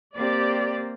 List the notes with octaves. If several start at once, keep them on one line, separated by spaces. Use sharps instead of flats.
A#3 C4 G4 D5